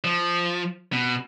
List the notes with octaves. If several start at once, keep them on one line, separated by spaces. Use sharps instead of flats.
F3
B2